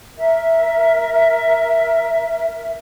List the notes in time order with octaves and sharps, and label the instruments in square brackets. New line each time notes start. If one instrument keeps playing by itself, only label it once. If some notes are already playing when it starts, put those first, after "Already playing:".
[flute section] A#4 E5